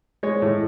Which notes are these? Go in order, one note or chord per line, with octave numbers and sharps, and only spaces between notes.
G#3 C#5
A2